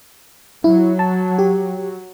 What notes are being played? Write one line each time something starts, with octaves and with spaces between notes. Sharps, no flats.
F#3 E4
A5
G4